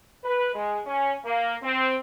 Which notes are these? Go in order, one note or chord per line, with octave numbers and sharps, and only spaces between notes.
B4
G#3
C#4
A#3
C4